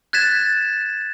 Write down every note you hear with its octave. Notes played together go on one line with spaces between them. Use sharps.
F#6 G#6 A6 B6 E7